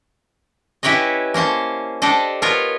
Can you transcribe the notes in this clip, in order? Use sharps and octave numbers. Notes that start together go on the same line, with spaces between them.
C#4 E4 G4 B4 C#5 D#5
A#3 C#4 C5 A5
D4 G4 A4 C5 D#5
B3 F4 A#4 C#5 F5